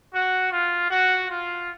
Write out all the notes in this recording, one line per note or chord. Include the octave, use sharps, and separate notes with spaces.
F#4
F4
F#4
F4